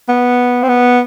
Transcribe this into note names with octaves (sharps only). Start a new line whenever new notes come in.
B3
C4
B3